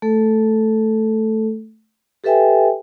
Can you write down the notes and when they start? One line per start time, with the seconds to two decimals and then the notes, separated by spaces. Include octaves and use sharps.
0.02 A3 A4
2.24 G4 A4 B4 E5 G5 G#5